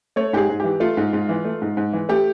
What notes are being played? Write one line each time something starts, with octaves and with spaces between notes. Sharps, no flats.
A3 C#5
G#2 G4 G#4
G#2
E3 G4
A3 F4
G#2
G#2
E3
A3
G#2
G#2
E3
A3 G4